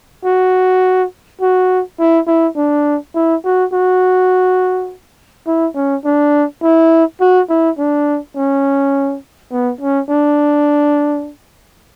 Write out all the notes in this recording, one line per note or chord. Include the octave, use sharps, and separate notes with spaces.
F#4
F#4
E4
E4
D4
E4
F#4
F#4
E4
C#4
D4
E4
F#4
E4
D4
C#4
B3
C#4
D4